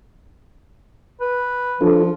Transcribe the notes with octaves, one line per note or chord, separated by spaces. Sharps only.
B4
F3 D4 F4 A4